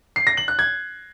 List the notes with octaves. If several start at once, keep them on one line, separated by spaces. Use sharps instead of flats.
C7
A#6
F#7
F#6
G#6